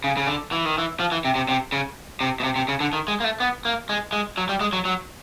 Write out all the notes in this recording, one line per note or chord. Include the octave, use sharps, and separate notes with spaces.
C#3
C#3
D3
E3
D#3
E3
F3
E3
C3
C3
C3
C#3
C3
B2
C3
C3
C#3
D3
D#3
G#3
A#3
A3
B3
A#3
G#3
G#3
F#3
G3
G#3
F#3
F#3